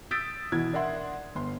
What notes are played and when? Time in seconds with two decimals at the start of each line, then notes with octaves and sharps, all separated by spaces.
0.11 D#6 E6 G6 A6 B6 D7
0.52 B2 E3 F#4 G#6
0.73 D4 A#4 E5 F#5 C6
1.35 G1 C6